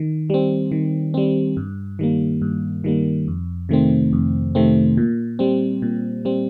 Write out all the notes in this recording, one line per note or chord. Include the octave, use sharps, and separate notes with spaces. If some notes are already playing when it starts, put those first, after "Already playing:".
Already playing: D#3
G3 C4
D#3
G3 C4
G2
D#3 G3 A#3
G2
D#3 G3 A#3
F2
C3 D#3 A3 C4
F2
C3 D#3 A3 C4
A#2
G3 C4
A#2
G3 C4